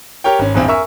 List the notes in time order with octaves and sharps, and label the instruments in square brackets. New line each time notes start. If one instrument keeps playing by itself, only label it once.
[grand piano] G4 A#4 C#5 G5
G#1 C#4
A#1 E2 G2 C4
A#4 E5 G#5 C#6 E6